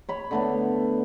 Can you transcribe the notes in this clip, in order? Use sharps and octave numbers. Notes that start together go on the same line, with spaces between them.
C#5 B5
D3 A3 B3